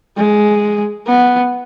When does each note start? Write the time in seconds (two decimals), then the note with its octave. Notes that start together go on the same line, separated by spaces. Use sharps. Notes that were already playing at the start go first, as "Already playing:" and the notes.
0.17 G#3
1.07 B3